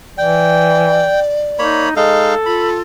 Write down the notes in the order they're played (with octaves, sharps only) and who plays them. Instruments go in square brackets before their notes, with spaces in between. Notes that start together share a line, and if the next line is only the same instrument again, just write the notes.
[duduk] E3 [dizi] D5 [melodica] G5
[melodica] A#3 C#5 B5 [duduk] D#4
[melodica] G#3 D#4 F5 [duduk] A4
[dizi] F4 [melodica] B5